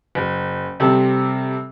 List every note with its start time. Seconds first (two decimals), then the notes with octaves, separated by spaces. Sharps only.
0.15 F#1
0.80 C3 G3 C4 A4